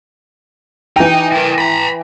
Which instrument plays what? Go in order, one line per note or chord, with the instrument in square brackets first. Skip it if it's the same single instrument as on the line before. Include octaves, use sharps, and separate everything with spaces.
[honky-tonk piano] E3 G5 [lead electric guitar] D#4
[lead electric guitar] E4 A#4
A#5 B5